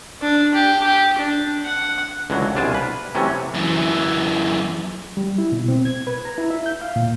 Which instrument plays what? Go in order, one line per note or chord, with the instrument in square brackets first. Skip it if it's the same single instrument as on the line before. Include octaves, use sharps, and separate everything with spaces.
[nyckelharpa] D4
G4
G4
D4
F#5
[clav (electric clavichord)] C#2 D3 E3 F#3
C2 B2 D4 F4 G#5 A5
B4
C3 E3 F#3 A3 C#4
[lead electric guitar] F#2 E3
[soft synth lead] G3
E4
B2
C4
G#6
B4
A#5
E4
E5
G6
F5
A#2